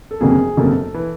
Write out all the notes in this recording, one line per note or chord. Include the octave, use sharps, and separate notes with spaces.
A4
G1 F2 C#3 F#3 A#3 G#4
G1 F2 C#3 F#3 A#3 A4
E3